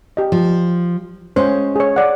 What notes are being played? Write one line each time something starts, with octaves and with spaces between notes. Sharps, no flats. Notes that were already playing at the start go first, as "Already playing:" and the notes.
G4 D#5
F3
G#3 C#4 C5
G#4 C#5
D5 F#5